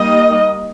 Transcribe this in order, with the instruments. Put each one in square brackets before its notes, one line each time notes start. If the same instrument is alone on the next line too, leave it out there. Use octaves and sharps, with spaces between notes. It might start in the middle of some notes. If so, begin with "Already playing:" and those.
Already playing: [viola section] G3 A#3 D#4 D#5